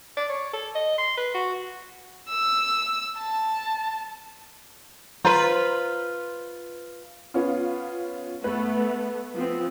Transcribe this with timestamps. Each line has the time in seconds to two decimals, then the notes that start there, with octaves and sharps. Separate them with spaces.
0.17 D5
0.29 C#5
0.53 A4
0.75 D#5
0.98 C6
1.17 B4
1.34 F#4
2.29 E6
3.17 A5
5.25 F4 B4 C5 A#5
7.34 B3 C#4 F4
8.44 A3 B3 B4
9.36 F3 B3 C4